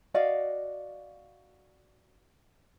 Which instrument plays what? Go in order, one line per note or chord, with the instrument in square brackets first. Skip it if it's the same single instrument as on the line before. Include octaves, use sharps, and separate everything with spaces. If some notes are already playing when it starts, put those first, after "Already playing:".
[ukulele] F#4 D5 D#5 F5